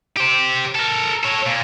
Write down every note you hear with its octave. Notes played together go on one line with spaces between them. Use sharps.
G4 C5
A4 A#4
A4 C#5
A#2